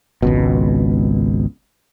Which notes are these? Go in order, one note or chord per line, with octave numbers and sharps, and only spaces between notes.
G#1 C#2 B2